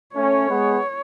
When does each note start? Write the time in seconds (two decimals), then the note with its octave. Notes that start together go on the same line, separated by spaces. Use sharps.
0.15 A3 C#4 C#5
0.48 G#3 B3